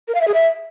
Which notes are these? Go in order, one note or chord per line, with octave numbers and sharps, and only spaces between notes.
A#4
F5
E5
G#4
E5